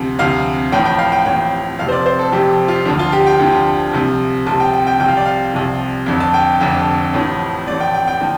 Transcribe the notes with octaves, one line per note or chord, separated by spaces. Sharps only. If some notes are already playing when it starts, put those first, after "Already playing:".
Already playing: D2 C3 F3
D2 C3 F3 F5
A1 A2 F3 G5
G5
F5
G5
A1 A2 F3 G5
F1 F2 C3 F3 F5
C5
D5
C5
A4
F1 F2 C3 F3 G4
F4
D2 D3 F3 D4
F4
G4
G5
D2 D3 F3
C2 C3 F3
C2 C3 F3 A5
G5
G5
G5
C2 C3 F3 G5
F5
D5
F5
C2 C3 F3
F1 F2 D3
A5
G5
F1 F2 D3
A1 A2 F3
A1 A2 F3 D5
G5
G5
G5
D3 F3